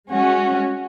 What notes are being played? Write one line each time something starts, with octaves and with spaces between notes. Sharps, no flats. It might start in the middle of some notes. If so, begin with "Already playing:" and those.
G#3 C#4 F#4